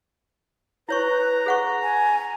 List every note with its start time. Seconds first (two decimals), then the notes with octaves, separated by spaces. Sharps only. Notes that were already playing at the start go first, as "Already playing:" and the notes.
0.89 E4 B4 C#5 A#5 C#6
1.46 G#4 F#5 C#6
1.83 G#5